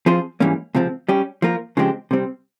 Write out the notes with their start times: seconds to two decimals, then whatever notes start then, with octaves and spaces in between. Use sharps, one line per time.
0.06 F3 C4 F4 G#4 C5
0.40 G#2 E3 G3 A#3 C#4
0.74 C#2 C3 F3 C4
1.09 G3 C#4 G4
1.42 F3 A#3 F4 A#4
1.77 C#3 F3 G#3 C4 G4
2.11 C3 G3 C4